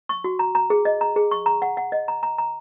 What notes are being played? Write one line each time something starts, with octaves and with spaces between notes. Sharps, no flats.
C#6
F#4
A#5
A#5
G#4
D#5
A#5
G#4
C#6
A#5
F#5
F#5
D#5
A#5
A#5
A#5